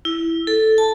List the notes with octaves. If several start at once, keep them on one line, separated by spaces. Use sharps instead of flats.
E4
A4
A5